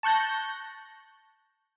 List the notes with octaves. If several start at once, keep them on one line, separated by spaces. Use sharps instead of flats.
A5 C#6 F#6 G6 A#6